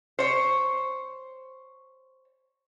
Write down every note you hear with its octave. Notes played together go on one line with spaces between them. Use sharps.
C5 C#5